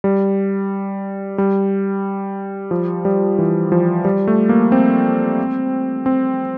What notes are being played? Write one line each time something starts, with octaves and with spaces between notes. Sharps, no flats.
G3
G3
F3
G3
E3
F3
G3
A3
A#3
C4
C4